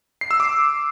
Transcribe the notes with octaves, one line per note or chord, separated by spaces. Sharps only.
C7
E6
D6